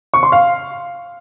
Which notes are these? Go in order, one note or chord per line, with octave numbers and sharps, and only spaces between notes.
C#6
C6
F5